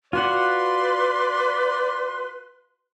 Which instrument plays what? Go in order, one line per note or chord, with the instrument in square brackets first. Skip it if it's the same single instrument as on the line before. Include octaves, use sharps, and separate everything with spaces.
[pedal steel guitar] F4 F#4 F#5 [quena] B4 [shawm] D5 [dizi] C6